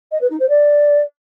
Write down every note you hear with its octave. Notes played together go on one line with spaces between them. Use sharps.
D#5
B4
D#4
C5
D5